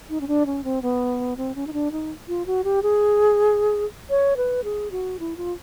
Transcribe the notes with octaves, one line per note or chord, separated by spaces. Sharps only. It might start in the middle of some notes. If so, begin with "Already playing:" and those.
D#4
C#4
D4
C#4
C4
B3
C4
C#4
D#4
D4
D#4
F4
F#4
G4
G#4
C#5
B4
G#4
F#4
E4
F4